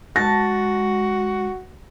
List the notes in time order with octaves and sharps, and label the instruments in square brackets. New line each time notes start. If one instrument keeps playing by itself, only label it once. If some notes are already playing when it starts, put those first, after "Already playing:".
[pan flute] G#3 [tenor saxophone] F#4 [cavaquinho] A5 [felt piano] A#6